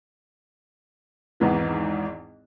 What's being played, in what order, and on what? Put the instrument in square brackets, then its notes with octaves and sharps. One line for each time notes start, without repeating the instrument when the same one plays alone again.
[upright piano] G#1 E2 G#2 E3